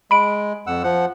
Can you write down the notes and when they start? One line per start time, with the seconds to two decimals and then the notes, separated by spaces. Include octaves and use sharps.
0.11 G#3 B5 D7
0.67 F2 F#5 E6
0.84 F3 F#5